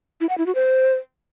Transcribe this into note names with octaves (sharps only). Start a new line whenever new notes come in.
E4
F#5
E4
F#4
C5